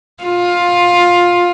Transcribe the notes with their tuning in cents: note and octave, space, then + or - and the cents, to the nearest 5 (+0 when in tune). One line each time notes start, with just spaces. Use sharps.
F4 +15